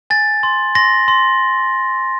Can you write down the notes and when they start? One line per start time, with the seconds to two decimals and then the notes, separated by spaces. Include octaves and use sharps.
0.10 G#5 A6
0.43 C6
0.75 C6 A#6
1.08 C6